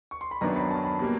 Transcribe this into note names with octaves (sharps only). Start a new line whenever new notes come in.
C#6
C6
B5
F#2 D#3 F#3 B3 D4 A#5
B5
A5
B5
B2 G3 A#3